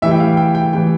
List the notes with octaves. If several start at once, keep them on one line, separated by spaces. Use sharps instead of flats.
A2 E3 G3 E5
G5
F5
G5
G5
A2 E3 G3 G5